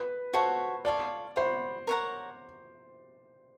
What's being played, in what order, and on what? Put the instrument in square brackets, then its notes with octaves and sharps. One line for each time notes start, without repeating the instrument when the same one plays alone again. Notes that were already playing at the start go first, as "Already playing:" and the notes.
Already playing: [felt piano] B4
[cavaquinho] F#4 A4 C#5 [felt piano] C5
[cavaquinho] F4 A4 C#5 F5 [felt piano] D5
[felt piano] C5 [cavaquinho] C#5 F#5 B5
[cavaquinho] A#4 C#5 F#5 A#5